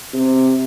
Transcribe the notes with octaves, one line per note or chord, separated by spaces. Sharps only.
C3